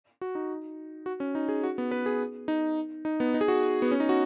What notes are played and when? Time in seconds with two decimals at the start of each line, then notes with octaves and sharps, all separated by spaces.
0.21 F#4
0.35 D#4
1.06 F#4
1.20 C#4
1.35 D#4
1.49 G#4
1.63 F#4
1.78 B3
1.91 B4
2.06 G#4
2.48 D#4
3.05 D#4
3.20 B3
3.34 D#4
3.41 G#4
3.48 F#4
3.82 B3
3.91 C#4
4.00 D#4
4.09 F#4